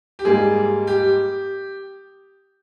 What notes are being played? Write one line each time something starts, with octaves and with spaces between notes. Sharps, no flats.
G4
G#2 G3 A#3 G#4
G4